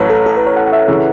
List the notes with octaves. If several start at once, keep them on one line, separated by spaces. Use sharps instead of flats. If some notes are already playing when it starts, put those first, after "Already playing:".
Already playing: A1 A2 F#3 B4 C#5
A4
A4
B4
C#5
F#5
F#5
E5
C#3 E3